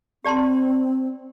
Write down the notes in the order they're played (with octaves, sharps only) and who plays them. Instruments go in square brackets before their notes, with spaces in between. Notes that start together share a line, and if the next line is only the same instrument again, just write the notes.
[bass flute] C4 [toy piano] G4 D5 A5 C6